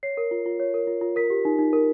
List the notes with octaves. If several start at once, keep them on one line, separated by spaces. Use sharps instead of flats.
C#5 C7
A#4
F4
F4
C#5
A#4
F4
F4
A#4 B6
G4
D#4
D#4
A#4